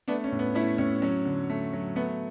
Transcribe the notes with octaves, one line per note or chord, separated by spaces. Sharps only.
A3 B3 D4
C#4
A2
B3
A3 C#4 E4
A2 C#4
F#3 C#4
D3
A3
F#3
A3 B3